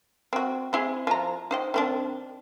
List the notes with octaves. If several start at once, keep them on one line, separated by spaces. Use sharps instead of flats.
C4 F#4
C4 E4 G#4
F3 A#5
D#4 C5 G5
D#3 C4 D4